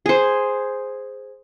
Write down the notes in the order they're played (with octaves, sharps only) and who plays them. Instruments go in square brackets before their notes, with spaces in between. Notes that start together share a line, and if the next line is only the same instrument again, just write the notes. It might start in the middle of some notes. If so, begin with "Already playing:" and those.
[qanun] G#4 C5